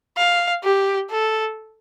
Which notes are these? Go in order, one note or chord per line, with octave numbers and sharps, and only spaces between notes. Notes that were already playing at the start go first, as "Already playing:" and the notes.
F5
G4
A4